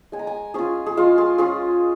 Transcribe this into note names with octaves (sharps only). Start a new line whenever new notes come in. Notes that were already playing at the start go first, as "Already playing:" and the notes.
G#3 G#5
A#5
G#5
C#4 F4 G#4
G#4
G#3 F4
G#4
C#4 F4 G#4